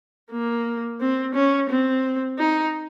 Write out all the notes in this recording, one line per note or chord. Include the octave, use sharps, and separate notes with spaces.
A#3
C4
C#4
C4
D#4